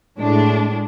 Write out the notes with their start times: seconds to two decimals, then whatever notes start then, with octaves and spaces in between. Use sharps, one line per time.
0.18 A2 G#3 D4